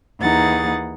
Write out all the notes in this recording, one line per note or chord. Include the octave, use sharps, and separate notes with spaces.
D#2 E3 D#4 G#4 F#5 A6